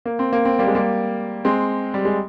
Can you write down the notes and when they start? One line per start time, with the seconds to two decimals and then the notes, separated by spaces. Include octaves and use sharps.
0.06 A#3
0.19 C4
0.33 A#3
0.45 C4
0.59 G3 A#3
0.67 G#3
0.75 G3 A#3
1.45 G#3 C4
1.94 G3
2.05 G#3